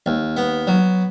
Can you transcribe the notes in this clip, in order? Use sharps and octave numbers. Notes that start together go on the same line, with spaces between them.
D#2
B3
F#3